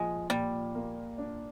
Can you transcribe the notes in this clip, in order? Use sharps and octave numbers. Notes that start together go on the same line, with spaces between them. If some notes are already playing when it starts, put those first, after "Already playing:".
Already playing: A#2 F3 G#3
A#2 G3
A#3
D4